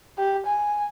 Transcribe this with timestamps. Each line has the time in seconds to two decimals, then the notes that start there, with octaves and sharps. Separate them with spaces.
0.18 G4
0.47 G#5